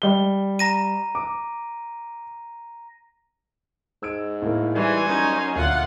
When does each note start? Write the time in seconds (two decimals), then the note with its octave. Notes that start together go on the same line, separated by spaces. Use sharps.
0.02 G3 G7
0.59 A#5 A#6 D#7
1.15 D6
4.03 G#2 E6 G#6 D7
4.42 A2 A#3
4.75 E3 G3 C5 C#5 G#5
5.07 F#2 C#4 D#4
5.56 D2 A#2 F4 F#5